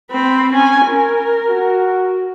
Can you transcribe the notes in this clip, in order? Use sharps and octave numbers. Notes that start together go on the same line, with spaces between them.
C4 B5
C#4 G#5
A#4
F#4